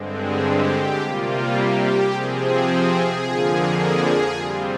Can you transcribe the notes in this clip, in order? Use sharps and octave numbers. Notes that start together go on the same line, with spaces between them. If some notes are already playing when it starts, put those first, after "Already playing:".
Already playing: G2 D3 G#3 C4
G#4
G4
C3 G3 A#3 F4
G4
C3 F3 C4 G#4
G#4
F2 D3 F3 A#3
G#4
C3 G3 C4 F4